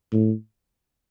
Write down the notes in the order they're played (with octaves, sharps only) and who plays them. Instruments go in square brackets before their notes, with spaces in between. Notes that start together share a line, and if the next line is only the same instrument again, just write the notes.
[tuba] A2